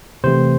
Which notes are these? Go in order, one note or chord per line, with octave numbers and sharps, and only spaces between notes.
C3 E3 A3 C4 C5